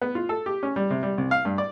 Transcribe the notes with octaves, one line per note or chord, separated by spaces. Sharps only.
B3
F4
A4
G4
C#4
G3
C3
G3
C2
F5
G2
D5